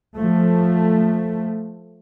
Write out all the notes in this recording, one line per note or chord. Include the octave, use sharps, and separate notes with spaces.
F3 A3